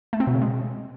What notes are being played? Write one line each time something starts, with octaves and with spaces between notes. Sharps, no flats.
A3
C4
B2
C#3
G#3